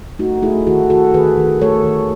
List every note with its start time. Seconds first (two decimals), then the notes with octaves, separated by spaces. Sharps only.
0.19 A3 D#4 F#4
0.42 A3 E4 G#4
0.67 D#3 F#4 A4
0.90 D#3 F#4 A4
1.14 D#3 G#4 B4
1.38 D#3
1.62 A3 A4 C#5
1.85 D#3